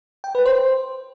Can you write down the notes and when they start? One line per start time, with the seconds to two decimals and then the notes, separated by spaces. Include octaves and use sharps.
0.24 G5
0.35 B4
0.46 C5